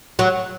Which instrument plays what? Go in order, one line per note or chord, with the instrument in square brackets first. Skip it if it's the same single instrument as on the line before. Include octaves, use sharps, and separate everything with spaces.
[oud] F#3